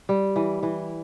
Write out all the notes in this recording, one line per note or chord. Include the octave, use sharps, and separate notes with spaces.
G3
E3
E3